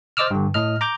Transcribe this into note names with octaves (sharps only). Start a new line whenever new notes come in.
C5 D5 D#5 D6 E6 F6
G2 D3
A2 D#5 F6
A#5 D6 G6